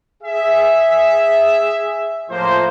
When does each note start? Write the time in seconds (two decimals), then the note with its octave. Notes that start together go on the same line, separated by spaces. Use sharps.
0.23 G#4 E5
2.30 A2 F3 A#3 C5